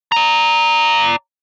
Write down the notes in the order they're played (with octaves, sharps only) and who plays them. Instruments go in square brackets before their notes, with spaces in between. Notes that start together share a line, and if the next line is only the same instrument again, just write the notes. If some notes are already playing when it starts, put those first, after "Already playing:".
[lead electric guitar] D5 A#5